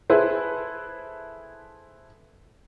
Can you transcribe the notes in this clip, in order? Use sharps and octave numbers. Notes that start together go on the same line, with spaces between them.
E4 G#4 A4 B4 C5